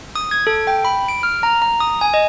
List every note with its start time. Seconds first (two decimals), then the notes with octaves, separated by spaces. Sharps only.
0.15 D#6
0.31 G#6
0.47 A4
0.67 G5
0.85 B5
1.08 D7
1.23 F6
1.43 A#5
1.62 A#5
1.80 D#6
2.01 G#5
2.14 D#5